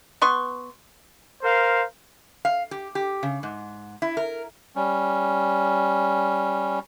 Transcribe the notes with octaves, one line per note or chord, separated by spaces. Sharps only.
B3 C6 C#6
A#4 C5 F5
F5
G4
G4
C#3
G#2
E4
A#4
G3 C#4